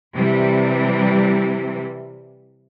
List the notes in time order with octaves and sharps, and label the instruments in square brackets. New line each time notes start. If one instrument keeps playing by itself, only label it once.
[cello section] C3 E3 G3